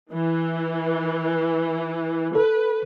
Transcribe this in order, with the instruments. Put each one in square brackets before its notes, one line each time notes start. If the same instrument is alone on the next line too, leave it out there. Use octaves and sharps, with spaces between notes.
[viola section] E3
[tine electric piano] A4 [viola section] B4